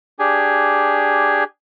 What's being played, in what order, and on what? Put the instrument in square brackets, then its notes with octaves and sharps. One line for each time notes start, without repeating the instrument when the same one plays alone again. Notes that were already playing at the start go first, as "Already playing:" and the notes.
[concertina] D4 G4 G#4 G#5